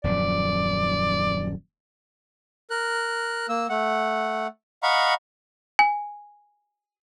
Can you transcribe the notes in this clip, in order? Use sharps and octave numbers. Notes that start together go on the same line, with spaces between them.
D#1 F#2 F3 D5
A#4 F#6
A#3 E6
A3 F#5
D#5 F5 F#5 A#5 B5 C#6
G#5